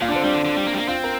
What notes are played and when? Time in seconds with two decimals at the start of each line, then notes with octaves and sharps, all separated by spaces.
0.01 A#2 F4
0.08 D4
0.12 D3 C4
0.23 G3 D4
0.34 D3
0.45 D3
0.57 G3
0.66 A#3
0.73 G3
0.78 A#3
0.88 C4 F4
1.04 A#4